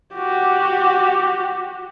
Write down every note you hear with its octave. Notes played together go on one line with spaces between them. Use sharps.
F#4 G4